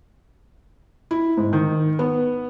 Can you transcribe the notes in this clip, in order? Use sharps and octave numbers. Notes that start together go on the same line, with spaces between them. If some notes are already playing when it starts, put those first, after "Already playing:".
E4
G#2
D#3
B3